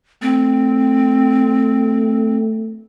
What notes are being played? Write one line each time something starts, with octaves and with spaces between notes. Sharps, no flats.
A3 C4